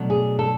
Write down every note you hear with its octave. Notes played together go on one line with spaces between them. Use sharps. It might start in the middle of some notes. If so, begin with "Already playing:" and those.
Already playing: B2 F#3 A3 D4
G#4
A4